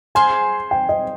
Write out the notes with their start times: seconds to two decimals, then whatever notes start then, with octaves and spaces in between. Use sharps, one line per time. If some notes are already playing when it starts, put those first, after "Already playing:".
0.15 G#4 C5 F5 G#5
0.71 G5
0.89 D#5